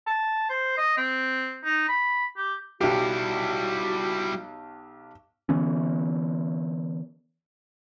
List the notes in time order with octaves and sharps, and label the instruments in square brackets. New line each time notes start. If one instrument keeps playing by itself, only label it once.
[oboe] A5
C5
D#5
C4
D#4
B5
G4
[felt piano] B1 G4 [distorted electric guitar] G3 E4 [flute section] F#4
[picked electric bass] D3 E3 B3 C#4